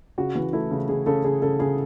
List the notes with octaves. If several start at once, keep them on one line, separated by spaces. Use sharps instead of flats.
C#3 F#4
E3
A3 E4
C#3
C#3 G#4
C#3 A4
C#3 G#4
C#3 A4
C#3 G#4